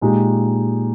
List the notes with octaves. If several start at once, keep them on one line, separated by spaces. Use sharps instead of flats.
A#2 G#3 D#4 G4